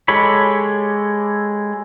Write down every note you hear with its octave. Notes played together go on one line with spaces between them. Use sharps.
G#3 G4 A4 C#5 B5